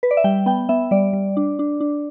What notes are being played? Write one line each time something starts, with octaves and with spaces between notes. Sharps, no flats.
B4
D5
E5
G3 G5
B3 G5
B3 E5
G3 D5
G3
D4
D4
D4